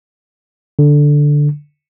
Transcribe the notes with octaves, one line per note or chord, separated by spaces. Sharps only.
D3